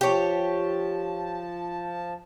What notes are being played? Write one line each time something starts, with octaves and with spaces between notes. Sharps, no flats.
F3 G4 C#5 A5